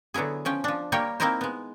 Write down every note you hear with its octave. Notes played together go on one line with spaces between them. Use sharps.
D3 F#3 B3 E4 G#4
F3 C#4 G5
F3 D4
G3 A#3 G4 A#4 C#5 G5
A#3 C4 D#4 E4 A#4 C5
G#3 B3